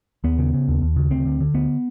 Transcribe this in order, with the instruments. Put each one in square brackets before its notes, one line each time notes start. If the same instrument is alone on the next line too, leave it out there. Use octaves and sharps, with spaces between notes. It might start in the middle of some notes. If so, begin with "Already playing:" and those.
[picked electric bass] D#2 B3
C#3
C#3
D#2
D#2
C#3
D2 C4
D3
D3
D2 B3